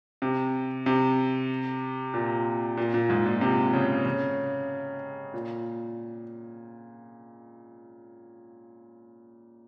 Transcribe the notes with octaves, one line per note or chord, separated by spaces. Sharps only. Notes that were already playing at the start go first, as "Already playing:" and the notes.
C3
C3
A#2
A#2
A#2
G#2
A#2
C3
C#3
C#3
A#2